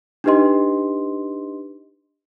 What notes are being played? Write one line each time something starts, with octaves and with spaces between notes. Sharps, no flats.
D4 D#4 G4 B4 D#5 C6